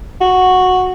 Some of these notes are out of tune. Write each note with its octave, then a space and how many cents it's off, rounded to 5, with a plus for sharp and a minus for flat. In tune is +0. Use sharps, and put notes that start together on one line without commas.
F#4 -5